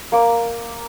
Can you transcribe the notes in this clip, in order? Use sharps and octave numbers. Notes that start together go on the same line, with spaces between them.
A#3 D6